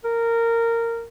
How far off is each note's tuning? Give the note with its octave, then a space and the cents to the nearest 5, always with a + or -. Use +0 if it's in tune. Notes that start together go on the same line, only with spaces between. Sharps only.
A#4 -15